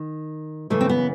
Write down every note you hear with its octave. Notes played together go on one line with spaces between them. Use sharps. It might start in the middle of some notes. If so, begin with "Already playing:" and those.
Already playing: D#3
F#2 C#3 E3 A3
C4
B3